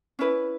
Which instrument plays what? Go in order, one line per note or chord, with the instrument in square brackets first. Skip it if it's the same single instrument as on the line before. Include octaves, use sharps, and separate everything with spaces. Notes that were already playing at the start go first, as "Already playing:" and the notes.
[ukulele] C#4 E4 B4